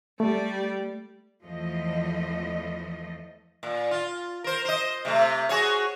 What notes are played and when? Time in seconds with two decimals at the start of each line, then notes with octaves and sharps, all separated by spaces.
0.20 G3 A3 D5
1.44 E2 F3 A3 D#5
3.63 A#2
3.91 F4
4.44 A#4 C5
4.65 C5 D#5
5.05 C3 F#3 A3
5.49 F#4 G#4 C#5